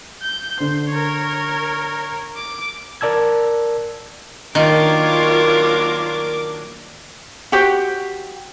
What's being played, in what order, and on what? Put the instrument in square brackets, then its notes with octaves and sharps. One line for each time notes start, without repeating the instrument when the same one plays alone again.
[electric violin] G6
[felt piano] D3 [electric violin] C5
[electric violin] A#4 C#5
D6
[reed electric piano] A#4 D5 A5 E6 G#6
[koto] D#3 [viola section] F#3 A#3 D4 [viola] F4 C#5 [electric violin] A#4 D6
[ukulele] F#4 G4 C5